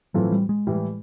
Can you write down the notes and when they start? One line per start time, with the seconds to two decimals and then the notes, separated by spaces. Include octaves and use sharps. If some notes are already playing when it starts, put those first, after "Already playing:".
0.14 A2 E3 F#3 A3 C4 F4
0.32 G3
0.49 G#3
0.67 A2 E3 G3